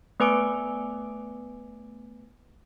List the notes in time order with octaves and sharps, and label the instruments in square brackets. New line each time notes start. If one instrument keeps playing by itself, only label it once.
[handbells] A3 B3 B4 G#5 D6 D7